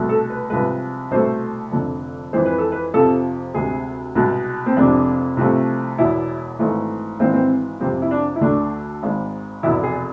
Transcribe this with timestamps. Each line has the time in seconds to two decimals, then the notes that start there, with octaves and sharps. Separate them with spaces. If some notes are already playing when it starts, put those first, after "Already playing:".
Already playing: C2 B2 A3
0.09 A4
0.30 B4
0.50 C2 C3 F3 G#3 B4
1.11 C2 B2 A3 C5
1.72 F1 F2 D3
2.33 F2 E3 G#3 C5
2.46 B4
2.58 A4
2.72 B4
2.94 F2 C3 F3 A4
3.54 D2 C3 G#3 G#4
4.15 C2 B2 G#3
4.66 C4
4.77 F1 F2 C3 G#3 D4
5.37 C2 C3 F3 A3
5.98 E1 E2 B2 E4
6.59 G#1 G#2 E3 A3
7.20 G#1 G#2 E3 G#3 C4
7.34 C4
7.80 F2 C3 G#3 C4
8.02 E4
8.11 D4
8.36 E4
8.41 D2 D3 A3 D4
9.03 G#1 G#2 G#3
9.63 F1 E2 B2 E4
9.83 G#4